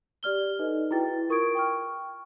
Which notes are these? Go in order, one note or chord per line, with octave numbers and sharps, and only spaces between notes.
G4 D5 F6 G7
D#4 A4 B4 D#5
E4 F#4 G#4 B4 G5 A6
F4 A#4 C#6 D#6 G#6 D7
G5 C#6 F6